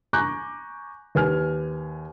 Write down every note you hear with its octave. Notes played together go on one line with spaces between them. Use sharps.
G#5 A#5 C#6 D6 F#6 G6
D#2 B4 G#5 F6